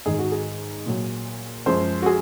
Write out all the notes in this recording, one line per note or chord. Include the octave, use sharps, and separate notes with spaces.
G#2 D#3 G#3 G#4
F#4
G#4
A#2 F#3
F#2 F3 G#3 C5
F#4
G#4